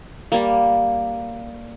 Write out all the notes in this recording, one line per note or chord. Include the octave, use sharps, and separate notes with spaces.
G3 A#3